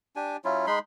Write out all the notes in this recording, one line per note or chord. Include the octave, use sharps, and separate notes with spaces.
D4 G4 G#5
F#3 C#4 E4 F4
G#3 D#4 B5 C6